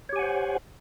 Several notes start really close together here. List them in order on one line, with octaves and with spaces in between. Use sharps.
C#5 G4 G#5 F#5 C5